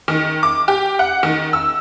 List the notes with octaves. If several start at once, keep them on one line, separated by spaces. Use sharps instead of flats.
D#3
D6
G4
F#5
D#3
E6